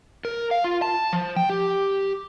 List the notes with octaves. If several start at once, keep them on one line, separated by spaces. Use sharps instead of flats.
A#4
F5
F4
A5
F3
G5
G4